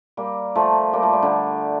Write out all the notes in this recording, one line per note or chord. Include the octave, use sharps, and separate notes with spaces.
G3 A#3
F3 A3
G3 A#3
F3 A3
G3
D3